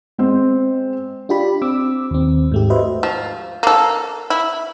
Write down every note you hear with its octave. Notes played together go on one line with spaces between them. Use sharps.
G#3 C4
D4 F4 G4 D5 B5
C4 D6 E6
D#2 C4
G#2 A3 G4
F#4 B4 C5 D#5 E5
F3
A#3 A4
E4